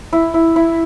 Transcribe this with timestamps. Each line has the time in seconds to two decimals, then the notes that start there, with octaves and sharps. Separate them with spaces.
0.13 E4
0.34 E4
0.56 E4